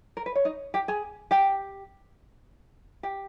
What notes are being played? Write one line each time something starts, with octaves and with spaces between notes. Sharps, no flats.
A#4
B4
C#5
D#4 D#5
G4 G5
G#4 G#5
G4 G5
G4 G5